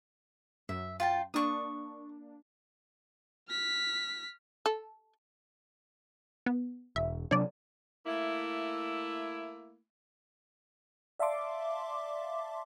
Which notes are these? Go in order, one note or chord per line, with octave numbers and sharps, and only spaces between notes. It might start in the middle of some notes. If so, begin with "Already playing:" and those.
F#2 E5
F4 G5 A5
A#3 D4 C#6 D#6
F6 B6
A4
B3
E1 E5
C3 F#3 D4 C#5 D5
A3 A#3 E4
D5 E5 F5 A5 C6 D6